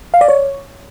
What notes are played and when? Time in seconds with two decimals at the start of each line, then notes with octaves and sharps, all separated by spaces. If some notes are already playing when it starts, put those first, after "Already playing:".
0.14 F5
0.21 D5
0.28 C#5